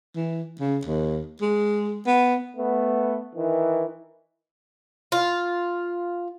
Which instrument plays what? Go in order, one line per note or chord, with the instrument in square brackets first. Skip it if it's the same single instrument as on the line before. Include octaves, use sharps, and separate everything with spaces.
[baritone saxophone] E3
C#3
D#2
G#3
B3
[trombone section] A3 B3
D#3 E3
[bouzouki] F4